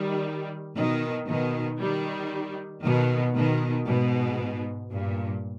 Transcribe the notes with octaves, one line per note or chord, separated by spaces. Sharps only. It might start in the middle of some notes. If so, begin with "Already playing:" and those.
Already playing: D#3 G3
B2 D#3
B2 D#3
D#3 G3
B2 D#3
B2 D#3
G#2 B2
G2 A#2